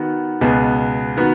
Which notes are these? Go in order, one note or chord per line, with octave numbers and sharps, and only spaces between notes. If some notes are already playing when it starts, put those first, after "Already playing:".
Already playing: D#3 B3 F#4
C#2 B2 B3 G#4
D#3 B3 F#4